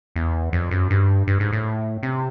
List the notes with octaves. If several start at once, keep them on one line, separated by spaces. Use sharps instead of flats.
E2
F2
F#2
G2
G2
G#2
A2
C3